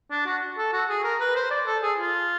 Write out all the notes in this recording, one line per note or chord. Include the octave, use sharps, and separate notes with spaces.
D4
F#4
A4
F#4
G#4
A#4
B4
C5
D5
A4
G#4
F4